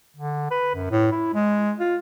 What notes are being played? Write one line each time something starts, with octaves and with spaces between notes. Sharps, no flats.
D3
B4
F#2
A2
E4
G#3
F4